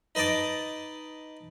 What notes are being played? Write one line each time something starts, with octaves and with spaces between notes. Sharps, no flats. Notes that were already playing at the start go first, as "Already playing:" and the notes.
D#4 B4 D#5 A5 D6